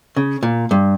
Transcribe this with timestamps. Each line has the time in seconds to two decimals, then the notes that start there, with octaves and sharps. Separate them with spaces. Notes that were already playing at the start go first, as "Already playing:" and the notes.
0.16 C#3
0.43 A#2
0.71 G2